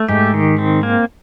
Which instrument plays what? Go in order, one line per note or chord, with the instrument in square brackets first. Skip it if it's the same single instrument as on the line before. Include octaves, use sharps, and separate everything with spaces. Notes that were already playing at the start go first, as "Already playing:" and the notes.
Already playing: [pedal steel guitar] A3
[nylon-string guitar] G#2 [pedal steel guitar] G4
[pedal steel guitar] D#3
C4
A#3